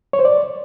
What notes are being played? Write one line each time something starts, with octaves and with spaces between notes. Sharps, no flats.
C#5
C5
D5